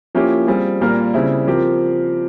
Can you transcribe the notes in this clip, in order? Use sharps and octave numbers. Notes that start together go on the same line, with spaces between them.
F3 A#3 C#4 E4 G4
G3 C4 F4 G#4
A#2 G3 A#3 F4 A#4
C#3 G3 C4 E4 G#4
F3 C4 G4 A#4